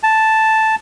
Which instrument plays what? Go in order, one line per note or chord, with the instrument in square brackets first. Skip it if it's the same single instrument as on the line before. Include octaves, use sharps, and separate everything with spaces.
[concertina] A5